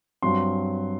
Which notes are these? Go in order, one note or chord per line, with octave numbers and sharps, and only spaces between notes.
G2 F#3 C4 C6